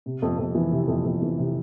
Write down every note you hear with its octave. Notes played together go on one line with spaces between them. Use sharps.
C3
F2
F2
E3
C3
F2
F2
E3
C3